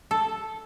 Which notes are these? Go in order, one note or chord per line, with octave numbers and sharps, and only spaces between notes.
A4